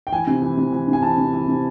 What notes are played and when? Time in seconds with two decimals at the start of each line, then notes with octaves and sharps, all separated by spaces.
0.07 G5
0.12 E3 G#5
0.27 C3
0.42 E3
0.57 C3
0.73 E3
0.88 C3 G#5
1.02 E3 A5
1.18 C3
1.33 E3
1.48 C3